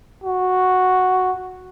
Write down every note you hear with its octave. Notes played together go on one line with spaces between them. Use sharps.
F#4